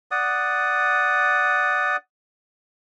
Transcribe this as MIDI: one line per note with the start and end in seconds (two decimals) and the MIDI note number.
0.11 1.97 74
0.11 1.97 78
0.11 1.97 87